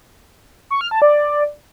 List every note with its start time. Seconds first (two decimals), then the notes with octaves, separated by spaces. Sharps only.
0.71 C#6
0.81 F6
0.91 A5
1.02 D5